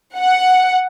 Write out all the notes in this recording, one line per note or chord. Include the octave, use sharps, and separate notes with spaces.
F#5